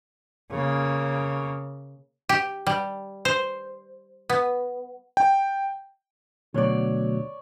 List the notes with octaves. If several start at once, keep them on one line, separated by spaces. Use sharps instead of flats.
C#3 A#3
G4
G3
C5
B3
G5
D2 B2 F#3 C#5 D5